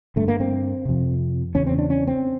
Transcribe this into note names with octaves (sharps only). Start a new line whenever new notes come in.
G2 D3 A3
A#3
C4
F2 C3
E2 C#3 C#4
C4
D4
C#4
C4